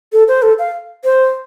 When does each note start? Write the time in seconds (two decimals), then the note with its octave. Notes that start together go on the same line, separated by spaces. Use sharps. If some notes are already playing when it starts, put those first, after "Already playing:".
0.13 A4
0.28 C5
0.42 A4
0.59 F5
1.04 C5